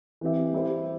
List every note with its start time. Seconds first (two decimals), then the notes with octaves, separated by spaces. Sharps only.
0.21 E3 C4 G4 E5
0.53 G3 E4 G4 C5